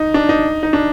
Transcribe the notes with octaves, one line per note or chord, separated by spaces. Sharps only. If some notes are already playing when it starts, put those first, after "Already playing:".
Already playing: D#4
D4
D#4
D#4
D4